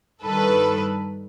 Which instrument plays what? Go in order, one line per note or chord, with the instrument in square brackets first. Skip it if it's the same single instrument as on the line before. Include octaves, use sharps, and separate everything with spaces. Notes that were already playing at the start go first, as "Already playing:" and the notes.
[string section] G2 D#3 A4 B4